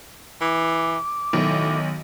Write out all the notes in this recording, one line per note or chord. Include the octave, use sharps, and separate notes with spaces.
E3 D6
B1 A2 D#3